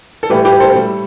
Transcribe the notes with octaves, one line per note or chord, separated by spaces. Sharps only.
A4
A2 E3 G3 G4 B4
G4 B4
A4 C5
A2 G3